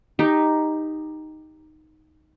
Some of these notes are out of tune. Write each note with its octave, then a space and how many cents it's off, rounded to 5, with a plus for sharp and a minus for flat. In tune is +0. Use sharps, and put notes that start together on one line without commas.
D#4 +0 G4 +10